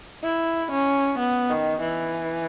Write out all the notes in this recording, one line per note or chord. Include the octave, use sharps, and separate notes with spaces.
E4
C#4
B3
D#3
E3